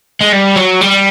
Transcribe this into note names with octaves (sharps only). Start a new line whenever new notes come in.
G#3
G3
F#3
G3